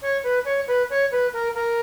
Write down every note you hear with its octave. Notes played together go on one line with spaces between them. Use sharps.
C#5
B4
C#5
B4
C#5
B4
A#4
A#4